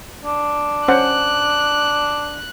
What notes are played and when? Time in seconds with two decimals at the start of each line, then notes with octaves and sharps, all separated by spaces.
0.23 D4
0.88 C#4 C5 F#5 F#6